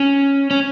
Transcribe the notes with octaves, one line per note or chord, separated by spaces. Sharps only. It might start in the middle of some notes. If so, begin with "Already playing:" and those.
Already playing: C#4
C#4